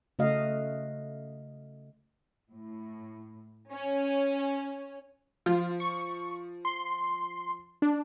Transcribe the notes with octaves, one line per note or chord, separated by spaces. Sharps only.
C#3 A3 F#4 D#5 F5
A2
C#4
F3 F4
C#6
C6
D4